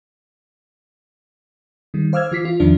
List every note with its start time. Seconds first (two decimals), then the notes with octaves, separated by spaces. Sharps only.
1.94 D#3 G3
2.13 C5 F5 D6 E6 F6 G#6
2.32 E3 F4 D6 B6 C7
2.45 F4
2.60 E2 D#3 F3 D4